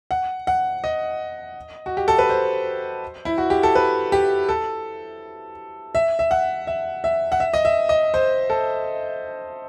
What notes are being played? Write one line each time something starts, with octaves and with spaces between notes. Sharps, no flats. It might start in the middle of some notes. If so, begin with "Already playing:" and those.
F#5
F#5
D#5
F#4
G4
A4
B4
C5
E4
F#4
G4
A4
B4
G4
A4
E5
E5
F#5
E5
E5
F#5
E5
D#5
E5
D#5
C5
A4